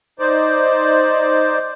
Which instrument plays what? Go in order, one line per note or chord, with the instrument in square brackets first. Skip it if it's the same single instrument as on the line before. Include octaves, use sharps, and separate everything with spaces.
[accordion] D#4 C5 D5